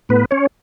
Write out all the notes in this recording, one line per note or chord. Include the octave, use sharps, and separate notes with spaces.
A2 B3 B4
C#4 C#5